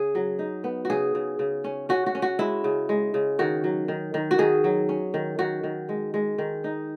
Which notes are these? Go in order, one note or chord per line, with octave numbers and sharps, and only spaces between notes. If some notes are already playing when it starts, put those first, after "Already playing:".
Already playing: C#3 G#4
F#3
D#4
B3
F#4
C#3 G#4
C#3
C#3
C#4
C#4 F#4
F#4
C#4
F#4
G#3 E4
C#3
G#3
C#3
D#3 F#4
F#3
D#3
D#3
F#4
D#3 G#4
F#3
C#4
D#3
D#3 F#4
D#3
G#3
G#3
D#3
D#4